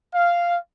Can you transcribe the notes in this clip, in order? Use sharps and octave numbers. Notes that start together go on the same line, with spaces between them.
F5